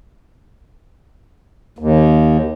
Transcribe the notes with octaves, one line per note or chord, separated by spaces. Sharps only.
D#2